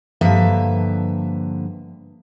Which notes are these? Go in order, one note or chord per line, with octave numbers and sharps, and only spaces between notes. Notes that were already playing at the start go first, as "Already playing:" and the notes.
G2 D3 F3 A#3 B4 E5